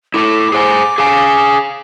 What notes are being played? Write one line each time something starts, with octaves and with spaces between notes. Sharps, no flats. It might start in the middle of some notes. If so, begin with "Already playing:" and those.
E4 A4 D6
G#4 C5 G#5
G#4 F5 G#5